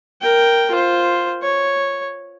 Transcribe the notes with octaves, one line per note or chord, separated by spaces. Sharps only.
A#4 G5
F4 C5
C#5